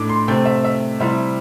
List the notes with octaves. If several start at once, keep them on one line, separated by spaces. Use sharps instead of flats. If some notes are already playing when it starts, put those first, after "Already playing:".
Already playing: A2 A3 D4 D6
C6
C3 A3 C4 G5
E5
E5
C3 G3 E4 E5